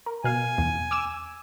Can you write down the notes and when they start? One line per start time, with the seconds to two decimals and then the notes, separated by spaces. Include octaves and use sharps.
0.06 A#4
0.24 B2 F5 G#5
0.58 E2
0.91 D6 E6 E7